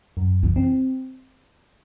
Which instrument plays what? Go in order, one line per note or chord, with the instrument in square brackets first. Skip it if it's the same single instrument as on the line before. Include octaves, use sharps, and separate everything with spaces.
[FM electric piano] F#2
[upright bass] E3
[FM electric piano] C4